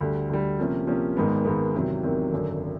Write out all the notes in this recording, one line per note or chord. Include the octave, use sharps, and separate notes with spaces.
D2 D3 G3
D2 D3 G3
C3 F3 A#3 C#4
C3 F3 A#3 C#4
G#1 G#2 D#3 G#3 B3
G#1 G#2 D#3 G#3 B3
E2 C3 D#3 F#3
E2 C3 D#3 F#3
G#1 F#2 D3